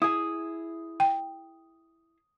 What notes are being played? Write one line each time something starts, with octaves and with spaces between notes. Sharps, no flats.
E4 G#4 D#6
G5